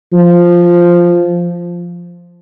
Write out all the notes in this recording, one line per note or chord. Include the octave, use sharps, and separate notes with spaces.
F3